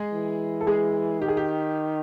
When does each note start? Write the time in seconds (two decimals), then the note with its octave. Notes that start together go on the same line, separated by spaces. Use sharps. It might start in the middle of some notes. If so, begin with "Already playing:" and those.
Already playing: G#3 G#4
0.13 E3
0.61 A4
0.67 G#3 G#4
1.21 D#3 G4
1.28 G#4
1.37 G4